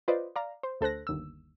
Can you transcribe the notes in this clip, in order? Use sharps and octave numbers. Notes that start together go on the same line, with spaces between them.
F4 B4 C5 D5 D#5
D5 F5 A#5
C5
D2 A4 C5 F#6 A#6
G1 D#2 E6